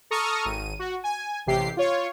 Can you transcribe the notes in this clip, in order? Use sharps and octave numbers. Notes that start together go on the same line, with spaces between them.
A4 A#5 C#6 D#6 F6
G#1 D#7
F#4
G#5
A1 C3 G4 C7
F4 C#5